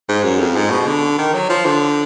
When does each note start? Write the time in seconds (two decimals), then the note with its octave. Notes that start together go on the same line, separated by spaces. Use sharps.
0.09 G#2
0.24 F#2
0.40 F2
0.56 G#2
0.71 B2
0.86 D3
1.18 D#3
1.34 F#3
1.49 F3
1.66 D3